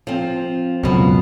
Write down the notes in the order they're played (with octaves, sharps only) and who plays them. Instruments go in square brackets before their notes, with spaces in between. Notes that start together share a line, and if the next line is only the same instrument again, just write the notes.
[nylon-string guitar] F3 C4
[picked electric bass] C#2 F#2 B2 [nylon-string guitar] F3 B3